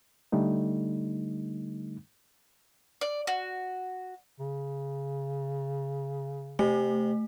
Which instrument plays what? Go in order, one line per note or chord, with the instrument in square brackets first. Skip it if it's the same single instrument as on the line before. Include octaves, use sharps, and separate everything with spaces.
[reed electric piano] D3 G3 A3 D#4
[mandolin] D5
F#4
[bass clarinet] C#3
[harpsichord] C3 [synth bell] A3